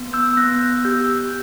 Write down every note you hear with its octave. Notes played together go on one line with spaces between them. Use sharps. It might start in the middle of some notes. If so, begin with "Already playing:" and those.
Already playing: B3
E6 G6
B3 F#6 A#6
G4 E6 G6